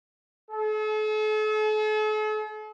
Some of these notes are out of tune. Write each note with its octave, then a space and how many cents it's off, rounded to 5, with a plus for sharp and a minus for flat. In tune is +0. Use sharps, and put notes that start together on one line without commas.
A4 -45